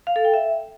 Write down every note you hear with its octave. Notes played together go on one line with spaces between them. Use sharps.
F5
A4
G5
E5